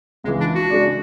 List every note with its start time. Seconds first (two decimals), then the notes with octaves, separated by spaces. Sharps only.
0.24 C#2 C#3 E3 G#3
0.40 D4
0.55 F#4
0.70 C#3 G#3 D4